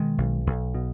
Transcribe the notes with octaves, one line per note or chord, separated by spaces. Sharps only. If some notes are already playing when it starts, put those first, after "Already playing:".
Already playing: B2 D#3 G#3
B1
B1
B2